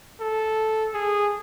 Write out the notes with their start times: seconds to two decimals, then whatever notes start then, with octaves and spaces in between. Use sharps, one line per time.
0.20 A4
0.93 G#4